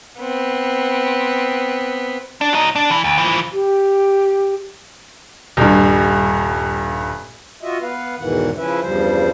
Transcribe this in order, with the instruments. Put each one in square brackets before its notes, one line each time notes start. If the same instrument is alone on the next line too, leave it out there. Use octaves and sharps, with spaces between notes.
[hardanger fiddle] B3 C4
[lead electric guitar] D4
F#3 D#4
D4
E3
D2
E3 F3
[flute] G4
[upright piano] D#1 G2
[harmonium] F4 F#4 D#5 E5
B3 B4 F5
E2 G#2 B2 D#3 E3 F#5
C#3 F3 C#4 E4 B4 E5
E2 G2 C#3 F3 G3 C5